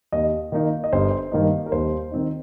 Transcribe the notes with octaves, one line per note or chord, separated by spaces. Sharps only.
D#2 D#5
D#3 A#3 D#4
D#5
G1 C5
G2 D#3 A#3 D#4
A#4
D#2 C5
D#3 C4 D#4